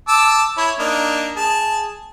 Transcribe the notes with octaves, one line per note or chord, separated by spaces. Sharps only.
A5 D6 E6
E4 C#5
A#3 D4 D#4
G#4 A5